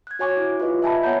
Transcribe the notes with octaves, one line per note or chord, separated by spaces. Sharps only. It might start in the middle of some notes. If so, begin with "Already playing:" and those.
F#6 G#6
F#4 C#5 G#5 C#6 D6
E4
F4 G4 B4 D#5
E5 G#5 A5 B5
B3 C#5 F#5 A#5 G6